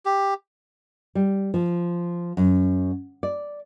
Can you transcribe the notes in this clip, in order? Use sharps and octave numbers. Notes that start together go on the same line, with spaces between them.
G4
G3
F3
F#2
D5